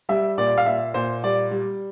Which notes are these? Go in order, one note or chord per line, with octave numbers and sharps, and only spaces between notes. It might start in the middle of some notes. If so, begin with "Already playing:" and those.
G3 E5
A#2 D5
F5
A#2 E5
A#2 C5
G3 D5
G3